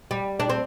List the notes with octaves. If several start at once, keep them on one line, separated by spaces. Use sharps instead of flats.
G3
D4
C4